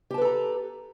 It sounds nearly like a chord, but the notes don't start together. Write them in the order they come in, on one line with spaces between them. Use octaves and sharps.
G4 A5 B4 A4 A#5